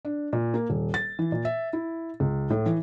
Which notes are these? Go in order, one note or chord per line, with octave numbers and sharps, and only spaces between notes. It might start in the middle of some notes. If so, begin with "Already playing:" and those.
D4
A#2
A#3
D#1
A6
E3
A#2
E5
E4
C#2
A2
E3